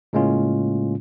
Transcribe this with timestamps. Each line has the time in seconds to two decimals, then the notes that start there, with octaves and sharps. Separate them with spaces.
0.13 A2 C#3 G#3 A#3 C#4 F4